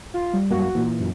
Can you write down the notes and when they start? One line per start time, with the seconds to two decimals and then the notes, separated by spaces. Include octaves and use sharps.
0.14 F4
0.34 G3
0.51 F#2 A#3 F#4
0.75 A#2 E3 A#3
0.99 F#2